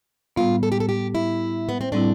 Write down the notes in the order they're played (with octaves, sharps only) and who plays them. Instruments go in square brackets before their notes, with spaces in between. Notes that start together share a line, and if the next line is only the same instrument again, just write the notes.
[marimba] A2 G3 B3 [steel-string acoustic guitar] F4
[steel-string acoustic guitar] A4
G4
A4
G4
E4
B3
C4
[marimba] A2 G3 C4 E4 [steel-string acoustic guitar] D4